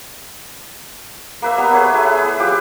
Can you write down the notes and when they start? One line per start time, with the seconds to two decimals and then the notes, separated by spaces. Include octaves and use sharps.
1.42 A#3 B4 E5
1.58 G3 B3 A#5
1.74 G#4 B4 C#5
1.93 A3 E4 G#4
2.18 B4
2.39 F3 G4 D6